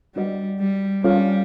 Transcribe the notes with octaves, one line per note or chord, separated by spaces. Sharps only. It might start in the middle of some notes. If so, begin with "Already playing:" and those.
G3 D4 F#4 B4 D#5 F#5
G3
G3 C#4 F4 A4 C#5 F5